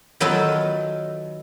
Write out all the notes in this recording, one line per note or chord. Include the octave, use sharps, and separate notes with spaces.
D#3 F#3 B3 D#4 F4 A4